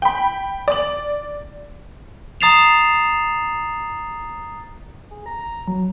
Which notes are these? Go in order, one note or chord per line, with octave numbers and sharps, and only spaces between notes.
G5 B5
D5 F#7
A#5 D#6 A6 C7 E7 F7
G#4
A#5
A#5
F#3